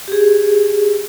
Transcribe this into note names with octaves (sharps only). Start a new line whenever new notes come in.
G4 G#4